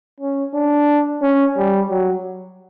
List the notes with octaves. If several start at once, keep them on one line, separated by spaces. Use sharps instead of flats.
C#4
D4
C#4
G3
F#3